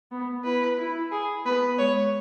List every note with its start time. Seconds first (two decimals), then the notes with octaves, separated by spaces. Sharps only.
0.11 B3
0.44 E4 B4
0.78 E4
1.12 G#4
1.45 B3 B4
1.79 G#3 C#5